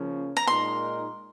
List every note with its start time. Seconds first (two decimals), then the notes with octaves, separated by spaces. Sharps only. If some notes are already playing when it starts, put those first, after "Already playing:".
Already playing: C#3 F3 A#3 C#4
0.37 A#5
0.47 A#2 G#3 D#4 A#4 C6